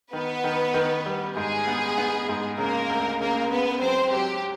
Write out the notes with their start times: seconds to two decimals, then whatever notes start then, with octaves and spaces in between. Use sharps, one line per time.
0.13 D#3 B3 B4
0.44 D#3
0.74 D#3
1.06 G3
1.36 G#2 G#4
1.67 B3
1.98 B3
2.29 G#2
2.59 C#3 A#3 A#4
2.90 D2
3.21 C#3 A#3 A#4
3.51 C#3 B3 B4
3.82 F#3 C4 C5
4.13 F#3 G4